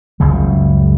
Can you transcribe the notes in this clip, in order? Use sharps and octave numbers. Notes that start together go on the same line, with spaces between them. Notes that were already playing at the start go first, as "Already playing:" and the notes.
F#1 C#2 C#3 G3